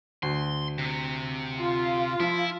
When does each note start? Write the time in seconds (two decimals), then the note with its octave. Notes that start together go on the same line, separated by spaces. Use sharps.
0.23 D2 C6
0.78 C3
1.59 F4
2.20 F3 E4